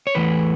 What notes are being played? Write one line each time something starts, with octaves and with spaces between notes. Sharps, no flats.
C#5
E2 E3 A3 B4